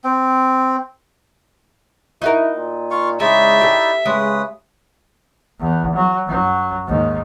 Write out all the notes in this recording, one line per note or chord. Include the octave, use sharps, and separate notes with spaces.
C4
D#4 E4 F#4 A#4
A#2
F4 F5 C#6
C#3 G#3 D#4 E4 D5 E5
G4 A4
C#3 G#3 B4 D#6
E2
F#3
F#2 F#3
D#2 G#2